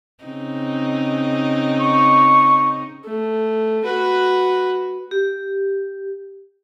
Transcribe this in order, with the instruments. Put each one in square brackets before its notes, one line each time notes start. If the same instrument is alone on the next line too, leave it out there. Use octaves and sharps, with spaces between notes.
[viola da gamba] C#3 C4 D#4
[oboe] C#6
[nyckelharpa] A3
F#4 B4
[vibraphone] G4